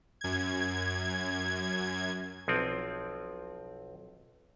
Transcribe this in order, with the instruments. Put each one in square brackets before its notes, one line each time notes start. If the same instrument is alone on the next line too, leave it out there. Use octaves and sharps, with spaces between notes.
[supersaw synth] F#2 G#6
[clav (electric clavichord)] B1 F3 C4